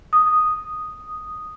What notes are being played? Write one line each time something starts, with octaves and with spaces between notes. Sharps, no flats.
D#6